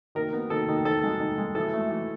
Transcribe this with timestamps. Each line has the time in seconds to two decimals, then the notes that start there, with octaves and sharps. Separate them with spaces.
0.15 D#3 A#4
0.33 B3
0.50 D#3 A4
0.68 D#3
0.85 D#3 A4
1.04 G#3
1.20 D#3
1.38 G#3
1.55 E3 A4
1.74 A3
1.91 E3